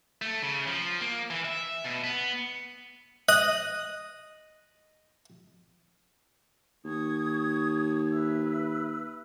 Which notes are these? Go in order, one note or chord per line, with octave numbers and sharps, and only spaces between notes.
A3
C#3
F3
A#3
E3
E5
B2
B3
D#5 F#6
D#2 C#6 D#6 G#6
B4 E5 E6